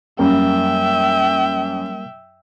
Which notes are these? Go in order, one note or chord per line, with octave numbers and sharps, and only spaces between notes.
F#2 G3 A#3 A#4 E5 G5